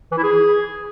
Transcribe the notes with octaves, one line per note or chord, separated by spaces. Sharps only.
E3
E4
G#4